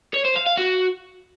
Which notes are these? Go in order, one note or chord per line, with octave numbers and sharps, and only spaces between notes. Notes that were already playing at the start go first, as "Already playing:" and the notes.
C#5
C5
F5
F5
F#4